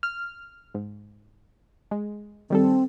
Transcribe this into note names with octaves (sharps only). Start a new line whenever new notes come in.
F6
G#2
G#3
D#3 G3 C4 A4